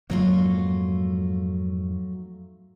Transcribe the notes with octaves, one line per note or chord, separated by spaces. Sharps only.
F2 G#2 F#3 A3 A#3 F4